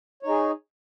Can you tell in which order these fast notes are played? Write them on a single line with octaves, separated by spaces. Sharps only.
C#5 D#4 G#4